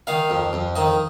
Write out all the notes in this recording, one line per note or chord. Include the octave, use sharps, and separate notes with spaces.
D#3 F5
F2
F2
D#3 D#5